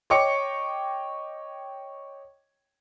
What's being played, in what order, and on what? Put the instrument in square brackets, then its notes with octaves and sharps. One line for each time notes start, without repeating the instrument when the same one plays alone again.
[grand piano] C#5 D#5 G5 C#6 D6 C#7